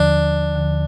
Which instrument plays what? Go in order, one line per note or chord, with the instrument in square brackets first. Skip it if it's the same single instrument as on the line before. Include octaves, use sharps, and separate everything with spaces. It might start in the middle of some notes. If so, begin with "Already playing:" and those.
Already playing: [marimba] D#2 D3 F3 [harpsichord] D4
[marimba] D#2 D3 F3